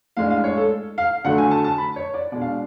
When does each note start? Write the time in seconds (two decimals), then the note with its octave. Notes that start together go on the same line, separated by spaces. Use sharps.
0.17 A2 G#3 D4 F5
0.30 F5
0.44 C#5
0.57 A4
0.98 F5
1.25 D3 F#3 A3 F#5
1.38 G#5
1.51 A5
1.64 A5
1.78 B5
1.96 C#5
2.14 D5
2.32 B2 G#3 D4 D5
2.41 F5